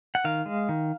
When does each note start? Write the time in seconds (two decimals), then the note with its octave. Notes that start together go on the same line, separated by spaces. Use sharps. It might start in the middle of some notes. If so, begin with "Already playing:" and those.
0.15 F#5
0.24 D#3 F5
0.46 G#3
0.69 D#3